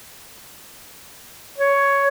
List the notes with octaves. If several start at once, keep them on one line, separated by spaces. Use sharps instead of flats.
C#5